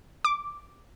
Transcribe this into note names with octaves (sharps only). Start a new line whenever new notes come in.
D6